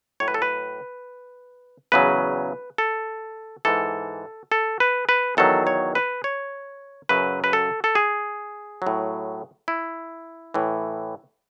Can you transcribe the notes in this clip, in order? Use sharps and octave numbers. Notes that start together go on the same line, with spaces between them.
A2 F#3 C#5
B4
A4
B4
E2 C#3 F#3 B4
A4
G#2 E3 A4
A4
B4
B4
E2 D#3 F#3 A4
C#5
B4
C#5
F#2 C#3 F#3 B4
B4
A4
A4
G#4
A2 F#3
E4
A2 E3